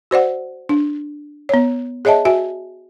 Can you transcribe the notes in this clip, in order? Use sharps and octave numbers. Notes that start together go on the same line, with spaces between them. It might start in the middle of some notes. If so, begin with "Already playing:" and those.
F#4 C5 D5 F#5
D4
B3 C#5
G#4 C#5 D#5 E5 A5
F#4 E5 G#5